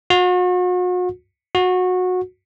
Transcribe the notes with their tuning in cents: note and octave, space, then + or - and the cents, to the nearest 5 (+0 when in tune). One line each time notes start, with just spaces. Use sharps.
F#4 -40
F#4 -20